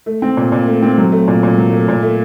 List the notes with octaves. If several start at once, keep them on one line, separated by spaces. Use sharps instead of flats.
A3
C4
A#2
A#2
A3
C4
F#3
A3
A#2
A#2
F#3
A3
A#2
A3